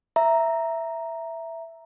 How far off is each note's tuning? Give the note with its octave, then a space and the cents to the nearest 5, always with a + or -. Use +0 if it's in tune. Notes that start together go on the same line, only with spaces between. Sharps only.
E5 +5 A#5 +0